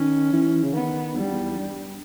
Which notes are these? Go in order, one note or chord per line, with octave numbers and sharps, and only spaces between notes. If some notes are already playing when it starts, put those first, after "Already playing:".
Already playing: D#3 C#4
E3
C#3
D#3 B3
E2 G3
G2
E2
G2